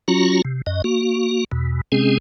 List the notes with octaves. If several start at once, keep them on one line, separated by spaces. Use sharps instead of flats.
F#3 C#4 F4 F#4 A#5
C3
F#2 D#5
A#3 F#4
E2 B2
C3 G#3 C4 C#4 G#4